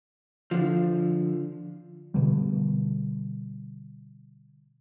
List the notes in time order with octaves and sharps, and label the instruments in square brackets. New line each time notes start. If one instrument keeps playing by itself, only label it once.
[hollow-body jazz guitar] D3 F3
[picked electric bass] B2 D3 G3